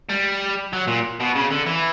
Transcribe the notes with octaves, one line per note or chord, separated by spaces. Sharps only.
G3
F#3
A#2
B2
C#3
D3
E3